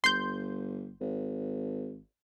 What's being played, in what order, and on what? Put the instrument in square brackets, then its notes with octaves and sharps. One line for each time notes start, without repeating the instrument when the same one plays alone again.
[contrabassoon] G1 [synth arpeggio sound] C6 G6
[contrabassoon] G#1